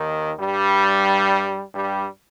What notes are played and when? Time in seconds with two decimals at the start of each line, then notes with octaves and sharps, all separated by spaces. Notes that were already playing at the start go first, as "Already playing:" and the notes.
Already playing: D#2 D#3
0.38 G2 G3
1.74 G2 G3